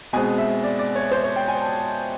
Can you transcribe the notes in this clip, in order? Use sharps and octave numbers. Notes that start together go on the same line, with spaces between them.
B2 G#3 C4 G#5
E5
D5
D5
C#5
C5
C#5
G5
G#5
A5